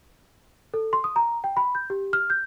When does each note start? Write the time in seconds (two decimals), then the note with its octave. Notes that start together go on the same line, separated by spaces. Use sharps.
0.74 A4
0.93 C6
1.04 D#6
1.16 A#5
1.44 G5
1.57 B5
1.75 G6
1.90 G4
2.13 F6
2.30 G6